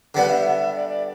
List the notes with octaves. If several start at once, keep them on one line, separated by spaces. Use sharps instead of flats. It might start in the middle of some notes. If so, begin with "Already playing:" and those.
D3 G3 B3 F#5
E5
D5
D5